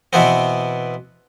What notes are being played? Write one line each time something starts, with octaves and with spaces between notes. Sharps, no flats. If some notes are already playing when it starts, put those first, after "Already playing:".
B2 E3 B3 C4